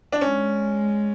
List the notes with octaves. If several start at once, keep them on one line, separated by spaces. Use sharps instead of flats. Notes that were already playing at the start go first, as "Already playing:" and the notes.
D4
G#3 C#4